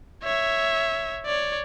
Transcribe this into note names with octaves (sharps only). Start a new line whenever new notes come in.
C#5 E5
C#5 D5